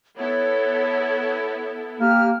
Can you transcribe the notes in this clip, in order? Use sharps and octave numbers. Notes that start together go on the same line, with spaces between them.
B3 E4 A4 C#5
A#3 G4 F6